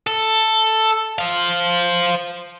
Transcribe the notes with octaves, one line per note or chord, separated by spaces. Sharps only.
A4
C5 F5